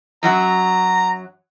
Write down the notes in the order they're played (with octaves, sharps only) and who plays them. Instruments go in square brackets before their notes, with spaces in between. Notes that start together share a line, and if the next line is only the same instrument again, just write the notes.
[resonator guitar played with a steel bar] F#2 F#3 F#4 [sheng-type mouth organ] A#5